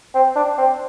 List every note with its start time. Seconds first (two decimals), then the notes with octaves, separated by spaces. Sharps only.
0.14 C4
0.36 D4
0.58 C4